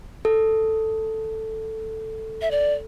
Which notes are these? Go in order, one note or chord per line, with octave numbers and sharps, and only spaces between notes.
A4
E5
D5